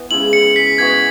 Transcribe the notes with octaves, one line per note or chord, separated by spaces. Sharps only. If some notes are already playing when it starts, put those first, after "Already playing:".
Already playing: E3 B3
C#3 G#3 E4 F#7
C#7
B6
E3 B3 F#4 G#6